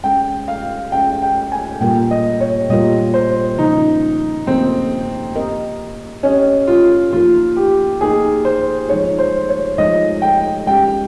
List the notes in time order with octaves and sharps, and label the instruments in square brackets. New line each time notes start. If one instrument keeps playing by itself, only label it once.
[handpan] G#3 C#4 G#4 [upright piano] G5
[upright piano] F5
[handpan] G#3 C#4 G#4 [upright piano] G5
[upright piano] G5
G#5
[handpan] A#2 G3 A#3 F4 A#4 [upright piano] G5
[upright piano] D#5
C#5
[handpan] A#2 G3 A#3 F4 A#4 [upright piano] D#5
[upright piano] C5
[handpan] C#3 F3 A#3 [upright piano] D#4
[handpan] C#3 F3 A#3 [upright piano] C4
[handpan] C4 G4 A#4 D#5
[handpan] C4 G4 A#4 D#5 [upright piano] C#4
[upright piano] F4
[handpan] F3 A#3 D#4 A#4 [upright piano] F4
[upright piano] G4
[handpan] F3 A#3 D#4 A#4 [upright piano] G#4
[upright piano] C5
[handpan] F3 G#3 D#4 G#4 [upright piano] C#5
[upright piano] C5
C#5
[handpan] F3 G#3 D#4 G#4 [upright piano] D#5
[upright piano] G5
[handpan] G#3 C#4 G4 [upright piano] G5